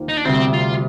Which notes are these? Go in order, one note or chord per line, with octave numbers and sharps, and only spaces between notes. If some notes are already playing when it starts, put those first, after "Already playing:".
Already playing: D#2 D#3 A#3 F4 C5
D#4
D4
D2 C3 G3 C4
F4